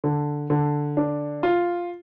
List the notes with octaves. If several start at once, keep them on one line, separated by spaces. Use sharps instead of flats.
D3
D3
D4
F4